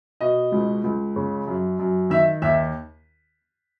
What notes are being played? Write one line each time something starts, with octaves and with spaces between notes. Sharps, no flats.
B2 D#5
C#2
C#2
C#3
F#2
F#2
D#3 E5
D#2 E5